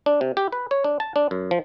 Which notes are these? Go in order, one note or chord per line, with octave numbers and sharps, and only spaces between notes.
D4
C3
G4
B4
C#5
D4
A5
D4
F#2
F3